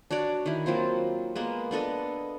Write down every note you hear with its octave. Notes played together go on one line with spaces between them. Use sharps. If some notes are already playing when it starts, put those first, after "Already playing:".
D4 F#4 C#5 D5
D#3 E4
F#3 A#3 C4 F4
G#3 A#3 B3
B3 D4 A4 D#5